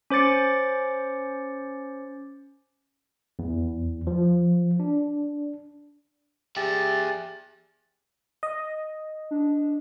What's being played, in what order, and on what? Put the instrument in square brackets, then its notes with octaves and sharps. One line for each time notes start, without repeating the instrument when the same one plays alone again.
[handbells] C#4 C5 D6 A6 C#7
[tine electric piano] E2
F3
D4
[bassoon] G4 [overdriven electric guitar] G#4 E5 [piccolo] A6
[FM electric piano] D#5
[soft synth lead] D4